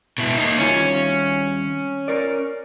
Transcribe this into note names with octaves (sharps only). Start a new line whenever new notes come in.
B2 E4
A#3 D#4
C2 D#3 C#4 F4
A#4 D5